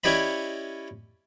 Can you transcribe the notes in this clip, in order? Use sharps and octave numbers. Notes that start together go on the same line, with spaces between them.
C#4 E4 G4 D5 D#5 B5